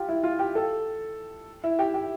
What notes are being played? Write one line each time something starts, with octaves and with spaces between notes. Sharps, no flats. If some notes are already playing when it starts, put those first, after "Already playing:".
Already playing: F4 G4
E4
F4
G4
A4
E4
G4
G4